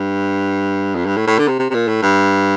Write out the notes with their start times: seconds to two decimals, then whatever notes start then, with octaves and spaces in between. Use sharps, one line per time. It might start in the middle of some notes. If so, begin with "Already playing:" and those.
Already playing: G2
0.96 F2
1.06 G2
1.17 A2
1.27 A2
1.38 D3
1.48 C3
1.59 C3
1.70 C3
1.74 A#2
1.88 A2
2.02 G2